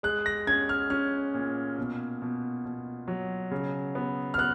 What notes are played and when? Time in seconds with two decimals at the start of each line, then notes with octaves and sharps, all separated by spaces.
0.03 G#3 F#6
0.26 A#6
0.47 C#4 G#6
0.69 F6
0.90 C#4 F6
1.34 A#2
1.78 B2
2.22 B2
2.65 B2
3.08 F#3
3.51 C#3
3.95 B3
4.34 F6
4.38 B3 F#6